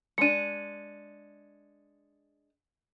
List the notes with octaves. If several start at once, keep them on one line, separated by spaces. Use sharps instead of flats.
G#3 D4 C#7 D#7